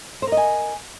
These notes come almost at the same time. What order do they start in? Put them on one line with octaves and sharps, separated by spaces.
C5 A#4 D#5 G#5